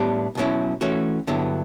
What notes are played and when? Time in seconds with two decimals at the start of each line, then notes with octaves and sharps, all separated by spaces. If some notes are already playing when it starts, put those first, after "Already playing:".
Already playing: A2 G3 B3 D4
0.35 B1 B2 F#3 C#4 E4
0.81 E3 A3 C#4 F#4
1.27 G2 D3 F#3 B3 E4